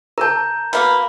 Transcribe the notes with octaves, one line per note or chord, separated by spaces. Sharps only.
A#4 A5 A#5 G6
B2 A#3 B5